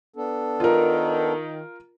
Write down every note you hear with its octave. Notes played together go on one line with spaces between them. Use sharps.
B3 D4 A4
D#3 F4 A#4